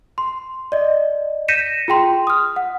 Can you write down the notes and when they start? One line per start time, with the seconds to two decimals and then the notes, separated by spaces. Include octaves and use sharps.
0.18 C6
0.72 D5 D#5
1.48 G6 A#6 B6 C#7 D#7 E7
1.88 F4 G#4 G5 C6
2.27 D#6 F6
2.56 F#5